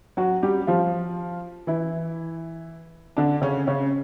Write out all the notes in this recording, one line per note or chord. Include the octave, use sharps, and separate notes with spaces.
F#3 F#4
G3 G4
F3 F4
E3 E4
D3 D4
C#3 C#4
C#3 C#4